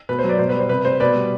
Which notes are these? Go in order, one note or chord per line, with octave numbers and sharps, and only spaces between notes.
B2 B4
C5
F#3
B4 D5
B2 C5
B4
G3
C5
C3 B4
G3 C5
B2 B4 D5
G3